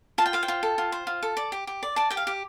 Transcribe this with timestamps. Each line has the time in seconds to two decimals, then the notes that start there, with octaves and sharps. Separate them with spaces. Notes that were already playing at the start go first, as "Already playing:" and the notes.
0.18 F4 A5
0.26 G5
0.33 C5 F5
0.43 G5
0.48 F4
0.63 A4
0.78 F4
0.92 C5
1.07 F4
1.23 A4
1.37 D5
1.52 G4
1.67 G4
1.83 D5
1.96 D5 A5
2.10 G4 G5
2.17 F5
2.27 G4